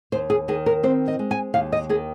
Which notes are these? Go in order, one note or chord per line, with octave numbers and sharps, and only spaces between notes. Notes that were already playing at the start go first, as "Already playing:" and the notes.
D#2 C5
G#4
D#3 G#4
A#4
C4 C5
D#5
G#3
G#5
D#2 F5
D#5
D#3 G#4